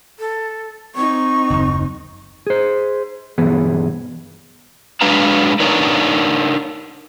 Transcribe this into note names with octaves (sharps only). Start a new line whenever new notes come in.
A4
C4 D#4 C#6
F#1 D#2
G#4 C5
B1 G2 E3 B3 G#4
F#3 G#3 D4 B4 F5 A#5
D4 D#4 A#4 B4 C#5